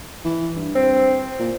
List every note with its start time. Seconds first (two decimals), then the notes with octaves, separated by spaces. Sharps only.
0.24 E3
0.56 G2
0.75 C4
1.39 A#2